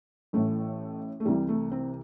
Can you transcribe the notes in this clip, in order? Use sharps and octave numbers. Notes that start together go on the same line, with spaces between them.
A1 A2 E3 A3
A3
C2 C3 E3 G3
A3
C4